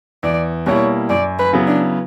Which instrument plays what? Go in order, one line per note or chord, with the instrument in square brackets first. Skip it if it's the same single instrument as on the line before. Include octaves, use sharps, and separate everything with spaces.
[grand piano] E2 [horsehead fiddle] D5
[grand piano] B2 G3 A#3 E4 [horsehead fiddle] C#5
[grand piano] F#2 [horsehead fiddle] D5
[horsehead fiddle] B4
[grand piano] C#3 F#3 B3 E4
[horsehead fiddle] D4